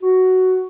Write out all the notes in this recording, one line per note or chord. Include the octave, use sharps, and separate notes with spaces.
F#4